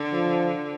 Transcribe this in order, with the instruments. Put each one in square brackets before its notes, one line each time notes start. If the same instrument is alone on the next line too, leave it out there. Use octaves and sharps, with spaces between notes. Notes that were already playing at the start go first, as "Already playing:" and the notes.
Already playing: [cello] D3
[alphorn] F3